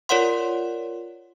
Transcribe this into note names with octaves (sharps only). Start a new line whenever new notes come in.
F4 A#4 C#5 D5 F#5 C6